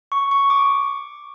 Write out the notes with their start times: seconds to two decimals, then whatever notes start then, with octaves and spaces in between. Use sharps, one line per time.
0.12 C#6
0.31 C#6
0.50 D6